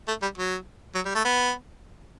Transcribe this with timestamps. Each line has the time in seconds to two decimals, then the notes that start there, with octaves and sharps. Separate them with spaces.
0.08 A3
0.22 G3
0.38 F#3
0.95 F#3
1.05 G3
1.15 A3
1.25 B3